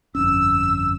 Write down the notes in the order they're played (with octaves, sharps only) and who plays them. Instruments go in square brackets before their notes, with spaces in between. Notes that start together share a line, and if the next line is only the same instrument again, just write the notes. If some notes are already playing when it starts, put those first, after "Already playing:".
[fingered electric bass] G1 F2 C#4 [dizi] E6